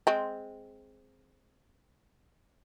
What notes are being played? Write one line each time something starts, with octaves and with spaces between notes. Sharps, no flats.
G#3 C4